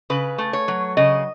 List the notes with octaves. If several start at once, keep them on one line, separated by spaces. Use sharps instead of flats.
C#3 B4
A3
C#5
F#3
C#3 D#5